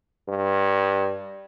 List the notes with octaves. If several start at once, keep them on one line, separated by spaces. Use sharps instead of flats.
G2